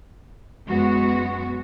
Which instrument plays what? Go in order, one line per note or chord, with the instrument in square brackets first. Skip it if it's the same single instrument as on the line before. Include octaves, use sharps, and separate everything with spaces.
[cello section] F#2 G#3 B3 F#4